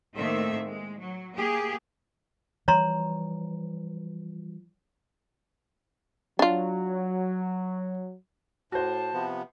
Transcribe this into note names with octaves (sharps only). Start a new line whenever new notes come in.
A2 D#3 A3 A#3 C4 E5
G#3
F#3
A#3 G4 G#4
E3 F3 G3 C#5 A#5 C6
F#3 D4 F4
A2 F#4 C5 A5
C3 F3 B3